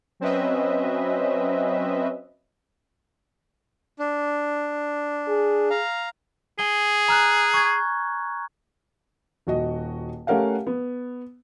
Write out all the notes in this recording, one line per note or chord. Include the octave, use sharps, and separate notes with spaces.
F#3 C4 C#4 B4 D#5 E5
D4
G#4
F5 A#5
G#4 G#5 G7
A#5 F6 F#6
C#6 G#6
D#1 F#4 D#5
A3 C#4 G4 A#4 F5 F#5
B3